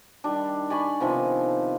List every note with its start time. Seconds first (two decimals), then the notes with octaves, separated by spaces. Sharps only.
0.24 D#3 G3 D4
0.70 D5 G#5 B5 C#6
1.00 C3 D#3 F3 B3